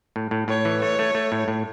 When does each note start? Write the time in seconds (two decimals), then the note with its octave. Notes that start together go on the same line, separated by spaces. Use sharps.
0.16 A2
0.31 A2
0.48 A2 C#5
0.65 E3
0.82 A3 C#5
0.99 A3
1.15 A3
1.32 A2
1.48 A2